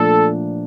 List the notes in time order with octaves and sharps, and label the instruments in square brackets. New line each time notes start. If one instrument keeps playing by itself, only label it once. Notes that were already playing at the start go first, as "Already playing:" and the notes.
Already playing: [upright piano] A#2 F3 A3 D4 [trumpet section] A4